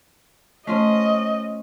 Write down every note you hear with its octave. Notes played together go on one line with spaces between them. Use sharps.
A3 C#4 F4 C5 D#5